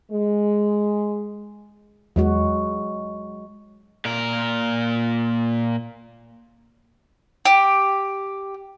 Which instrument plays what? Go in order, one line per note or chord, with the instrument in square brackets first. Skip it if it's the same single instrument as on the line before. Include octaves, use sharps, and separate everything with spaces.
[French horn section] G#3
[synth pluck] E2 [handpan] F#3 G#3 F#4
[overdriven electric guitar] A#2 A#4
[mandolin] G4